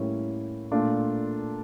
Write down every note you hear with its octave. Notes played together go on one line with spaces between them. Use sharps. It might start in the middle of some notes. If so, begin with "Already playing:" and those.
Already playing: A2 G3 A#3 C#4 E4
A#2 A3 D4 F4